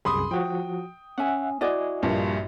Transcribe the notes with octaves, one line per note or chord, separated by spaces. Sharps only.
C2 F#2 G#4 B5 C6 D#6
F3 F#4 G5
C#4 E5 F#5 G#5
E4 F#4 D5 D#5 G#5
A#1 G2 A#2